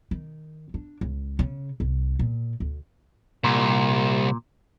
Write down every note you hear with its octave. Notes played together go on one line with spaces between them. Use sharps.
D#3
D4
C#2
C#3
C2
A#2
D2
C2 A#2